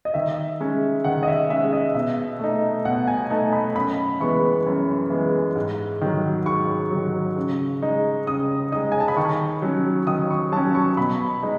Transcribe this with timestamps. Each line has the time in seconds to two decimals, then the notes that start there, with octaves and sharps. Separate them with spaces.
0.05 D#5
0.14 D#3 E5
0.60 G#3 C#4
1.04 D#3 F#5
1.23 D#5
1.27 E5
1.50 G#3 C#4 E5
1.73 D#5
1.94 B2 E5
2.40 A3 D#4
2.85 B2 F#5
3.07 G#5
3.30 A3 D#4 A5
3.53 B5
3.75 F#2 B5
4.20 E3 G#3 B3 C#6
4.66 F#2
5.10 E3 G#3 B3
5.56 G#2
6.01 D#3 F#3
6.46 G#2 C#6
6.91 D#3 F#3
7.36 C#3
7.82 G#3 D#4
8.27 C#3 D#6
8.72 G#3 D#4 D#6
8.92 G#5
9.00 A5
9.08 B5
9.17 D#3 C#6
9.62 F#3 C#4
10.07 D#3 D#6
10.30 C#6
10.52 F#3 C#4 A5
10.75 C#6
10.97 B2 B5
11.43 G#3 D#4